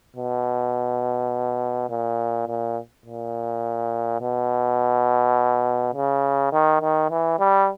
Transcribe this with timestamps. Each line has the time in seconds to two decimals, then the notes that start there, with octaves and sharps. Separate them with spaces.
0.17 B2
1.90 A#2
2.48 A#2
3.06 A#2
4.21 B2
5.94 C#3
6.52 D#3
6.82 D#3
7.11 E3
7.39 G3